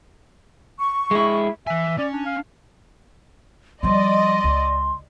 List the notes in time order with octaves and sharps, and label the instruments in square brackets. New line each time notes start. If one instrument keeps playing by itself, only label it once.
[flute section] C#6
[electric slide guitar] G#3 E4
[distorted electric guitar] E3 G#5 [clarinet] E5
[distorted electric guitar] C#4 [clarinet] D5
[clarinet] D4
F5
[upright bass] F3 G3 [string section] D5 D#5 [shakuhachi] C6
[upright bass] C#2